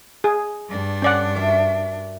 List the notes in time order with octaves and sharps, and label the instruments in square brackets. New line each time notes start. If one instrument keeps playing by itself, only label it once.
[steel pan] G#4
[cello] G2 D4
[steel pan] C#4 D5 F#5 [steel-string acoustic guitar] A4
[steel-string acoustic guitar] F#4 A#4 E5